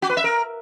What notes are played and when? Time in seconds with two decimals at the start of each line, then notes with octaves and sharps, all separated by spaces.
0.02 F#4
0.10 B4
0.17 E5
0.24 A#4